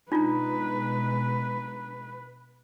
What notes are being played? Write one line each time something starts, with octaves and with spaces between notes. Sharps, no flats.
B2 G#3 D4 D#4 F4 B4 A#5